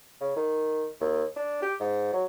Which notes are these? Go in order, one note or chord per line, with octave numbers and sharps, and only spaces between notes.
C#3
D#3
D#2
D4
G4
G#2
F#3